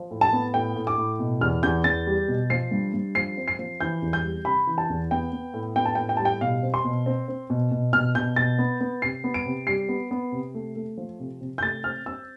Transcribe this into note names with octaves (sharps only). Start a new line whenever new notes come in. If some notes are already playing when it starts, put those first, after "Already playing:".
Already playing: F3
A2
A5
B3
A2 G5
A2
D6
A2
B2
E2 F6
E2 G6
E2 A6
G3
B2
F3 C7
G2
G2
F3 C7
C4
C7
F3
E3 G6
E2
G6
G3
C3 B5
E3
A5
E2
B3 G5
B3
A2
B3 G5
A5
A2 G5
G5
G3 A5
G5
B2 F5
C4
C6
B2
C4
C4
B2
B2
B2 F6
B2 G6
B2 A6
B3
B3
C3 C7
B3
D7
C3
G3 C7
B3
B3
C3
A3
A3
F3
C3
C3
G6
A3 A6
C4 F6
C4 E6